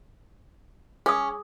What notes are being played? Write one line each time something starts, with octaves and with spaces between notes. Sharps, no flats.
C#4 G#4 D#6